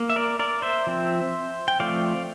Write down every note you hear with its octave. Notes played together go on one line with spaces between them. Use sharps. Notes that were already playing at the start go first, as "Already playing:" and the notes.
Already playing: A#3
E5
A#4 D5
A#4 D5
C5 E5
F3 C4
G5
F3 A3 C4 D5 F5